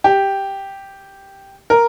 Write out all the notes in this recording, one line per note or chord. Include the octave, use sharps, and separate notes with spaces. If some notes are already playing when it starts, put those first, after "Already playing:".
G4
A#4